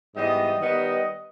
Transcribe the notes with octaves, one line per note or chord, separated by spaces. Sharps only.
G#2 E3 G3 B3 D#5
D#3 G3 B3 D#5